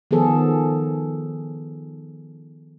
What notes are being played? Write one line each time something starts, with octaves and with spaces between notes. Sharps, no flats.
D#3 F3 B3 G#4 A4